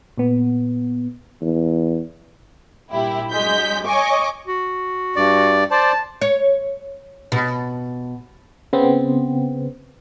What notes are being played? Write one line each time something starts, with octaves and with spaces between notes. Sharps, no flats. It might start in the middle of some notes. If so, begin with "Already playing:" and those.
A#2 B3
E2
G2 A#2 E4 G4
G2 F#3 G#3 G6 B6
C#5 D#5 G#5 C#6 D6
F#4
G2 D5
C5 D5 A5
C#5
B2
C#3 B3 C4